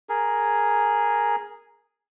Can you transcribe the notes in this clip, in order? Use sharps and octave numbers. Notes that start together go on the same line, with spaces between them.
G#4 A#4